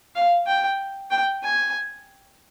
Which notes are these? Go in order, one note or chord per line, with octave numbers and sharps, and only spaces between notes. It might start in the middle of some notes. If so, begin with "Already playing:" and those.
F5
G5
G5
G#5